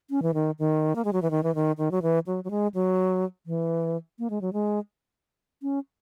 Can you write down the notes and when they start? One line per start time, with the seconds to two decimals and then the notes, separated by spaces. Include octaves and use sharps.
0.10 C#4
0.22 E3
0.34 D#3
0.59 D#3
0.95 A#3
1.05 G#3
1.13 F#3
1.22 E3
1.31 D#3
1.43 E3
1.55 D#3
1.78 D#3
1.91 F#3
2.02 E3
2.27 F#3
2.44 F#3
2.51 G#3
2.74 F#3
3.46 E3
4.19 A#3
4.30 G#3
4.41 F#3
4.53 G#3
5.62 C#4